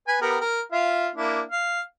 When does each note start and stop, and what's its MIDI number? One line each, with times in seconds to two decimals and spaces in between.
0.08 0.17 71
0.08 0.17 80
0.21 0.38 59
0.21 0.38 67
0.21 0.38 70
0.41 0.61 70
0.72 1.09 65
0.72 1.09 76
0.72 1.09 77
1.15 1.42 58
1.15 1.42 62
1.15 1.42 64
1.51 1.81 77